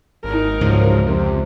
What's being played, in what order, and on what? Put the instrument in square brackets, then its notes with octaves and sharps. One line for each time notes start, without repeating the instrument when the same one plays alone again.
[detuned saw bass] G#1 [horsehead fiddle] D#4 A#4
[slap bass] C#2 D3 [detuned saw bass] G#2 [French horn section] F3 F#3
[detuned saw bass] F2 [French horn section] C3